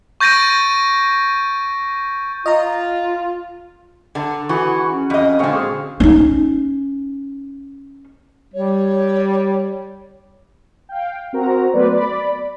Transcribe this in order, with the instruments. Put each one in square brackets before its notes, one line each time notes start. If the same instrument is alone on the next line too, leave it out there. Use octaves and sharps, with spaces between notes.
[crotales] C#6 G6 A6 A#6 D7 D#7
[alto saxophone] F4 [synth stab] D#5 A#5
[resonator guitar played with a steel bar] D3 [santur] F#5 A5 A#5
[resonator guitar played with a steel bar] E3 [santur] F#4 G#4 [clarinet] C#6
[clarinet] C#4
[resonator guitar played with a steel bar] F2 D#5
[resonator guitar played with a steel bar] A#2 D3 [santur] G#3 C4 F5 [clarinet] C#6
[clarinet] G#4
[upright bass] C#4 D#4
[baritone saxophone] G3 [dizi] C#5
[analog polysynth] F5 G5
C4 F#4 A#4 A#5
F#3 A3 B3 B4 C5 D5
D5 B5